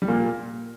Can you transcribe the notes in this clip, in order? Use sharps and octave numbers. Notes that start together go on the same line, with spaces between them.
G3
A#2 A#3